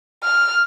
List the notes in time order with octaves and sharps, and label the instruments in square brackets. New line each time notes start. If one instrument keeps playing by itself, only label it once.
[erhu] F6